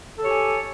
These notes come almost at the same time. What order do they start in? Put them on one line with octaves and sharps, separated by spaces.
A4 C#5 G4 G#5